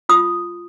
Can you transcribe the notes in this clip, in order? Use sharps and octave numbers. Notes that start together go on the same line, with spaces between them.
F4 D#6